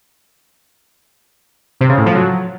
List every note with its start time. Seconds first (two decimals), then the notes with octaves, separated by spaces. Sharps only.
1.81 C3
1.89 C#3
1.98 A2
2.06 F3
2.15 F#3